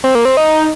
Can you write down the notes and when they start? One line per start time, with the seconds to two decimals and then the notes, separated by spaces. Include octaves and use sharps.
0.04 C4
0.15 A#3
0.25 C4
0.37 D#4